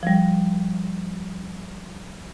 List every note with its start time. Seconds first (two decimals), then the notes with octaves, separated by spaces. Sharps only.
0.03 F3 G3